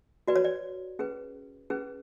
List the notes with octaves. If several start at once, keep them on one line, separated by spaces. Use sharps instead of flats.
F#4 B4 D5
C#5
D5
C#4 G#4 B4
C#4 G#4 B4